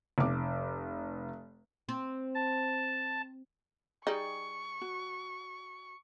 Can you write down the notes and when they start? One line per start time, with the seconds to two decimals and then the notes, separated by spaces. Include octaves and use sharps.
0.18 F1 D6
1.89 C4
2.35 A5
4.07 G3 D#4 G#4 D5 C#6
4.82 F#4